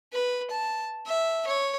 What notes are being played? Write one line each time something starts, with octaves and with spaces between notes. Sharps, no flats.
B4
A5
E5
C#5